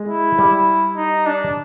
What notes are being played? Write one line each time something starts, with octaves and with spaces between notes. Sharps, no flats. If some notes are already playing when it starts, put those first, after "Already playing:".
Already playing: G#3
E4
G3
D#4
D4